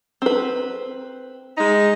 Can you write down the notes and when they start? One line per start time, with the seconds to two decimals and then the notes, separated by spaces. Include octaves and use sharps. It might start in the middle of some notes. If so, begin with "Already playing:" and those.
0.22 C4 B4
1.57 G#3 D#4